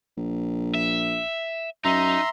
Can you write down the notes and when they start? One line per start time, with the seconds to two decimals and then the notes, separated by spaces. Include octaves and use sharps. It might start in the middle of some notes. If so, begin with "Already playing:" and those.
0.17 A#1
0.75 E5
1.85 F#2 D#4 E5 A#5 C6